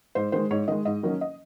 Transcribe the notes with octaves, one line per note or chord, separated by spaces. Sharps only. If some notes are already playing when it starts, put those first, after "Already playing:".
G#2 C5
D#3 G#3 C5
G#2 C#5
D#3 G#3 D#5
G#2 D#5
D#3 F#3 A#3 C#4
D#5